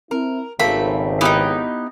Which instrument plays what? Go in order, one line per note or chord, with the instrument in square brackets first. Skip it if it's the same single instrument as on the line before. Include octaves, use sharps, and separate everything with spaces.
[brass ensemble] C4 E4 [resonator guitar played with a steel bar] A#4
[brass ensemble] G#1 C#2 [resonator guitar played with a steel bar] A3 A#3 C4 [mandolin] B5
[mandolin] B3 D#4 [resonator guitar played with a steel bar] E4 G4 G5